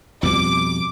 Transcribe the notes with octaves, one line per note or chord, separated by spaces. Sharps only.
F2 B2 G3 D6